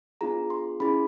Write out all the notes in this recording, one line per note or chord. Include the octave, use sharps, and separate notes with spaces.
B3 D4 F4 G#4 A#5
C6
C#4 E4 G#4 B5